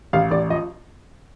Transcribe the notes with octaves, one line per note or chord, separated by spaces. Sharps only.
A1 F5
A1 D5
F3 D#5